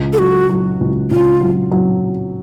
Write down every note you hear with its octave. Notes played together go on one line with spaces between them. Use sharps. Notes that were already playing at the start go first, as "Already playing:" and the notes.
Already playing: C#2
A4
F#3 F#4
F#3
C#2
C#2 F4
F#3
F#3